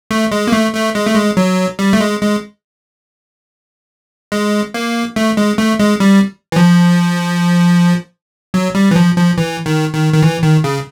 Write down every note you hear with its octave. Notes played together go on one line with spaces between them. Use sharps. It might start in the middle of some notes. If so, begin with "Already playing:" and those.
A3
G#3
A#3
A3
A3
G#3
A3
G#3
F#3
G3
A3
G#3
G#3
G#3
A#3
A3
G#3
A3
G#3
G3
E3
F3
F#3
G3
E3
F3
F3
E3
D#3
D#3
D#3
E3
D#3
C#3